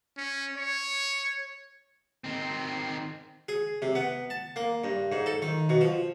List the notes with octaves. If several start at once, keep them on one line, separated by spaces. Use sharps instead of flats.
C#4
C#5
D#3 C4
G#4
C3
B3
A5
A#3
G2
G#2
A4
D#3
B2
F3